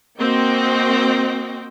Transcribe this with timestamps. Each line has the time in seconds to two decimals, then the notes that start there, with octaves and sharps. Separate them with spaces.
0.18 A#3 C4 F#4 C5 D#5 G5